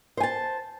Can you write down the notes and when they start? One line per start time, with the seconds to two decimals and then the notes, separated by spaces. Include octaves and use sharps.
0.17 C5
0.20 G#5
0.23 A5